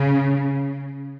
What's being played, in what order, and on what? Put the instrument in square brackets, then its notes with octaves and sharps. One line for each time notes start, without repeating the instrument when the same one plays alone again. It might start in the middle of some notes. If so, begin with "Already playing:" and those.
Already playing: [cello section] C#3